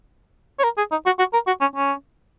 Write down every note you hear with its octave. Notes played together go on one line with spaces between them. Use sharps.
C#5
A#4
G#4
D#4
F#4
F#4
A#4
F#4
C#4
C#4